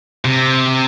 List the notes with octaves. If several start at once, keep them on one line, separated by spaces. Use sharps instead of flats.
C3